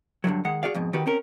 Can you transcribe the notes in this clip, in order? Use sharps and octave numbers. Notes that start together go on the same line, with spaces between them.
G2 D3 E3 F#3
D#3 G#3 F#5
F#4 G#4 D5 F5
F2 G#2 B2
D#3 F#4 G4 B4
C4 C#4 A#4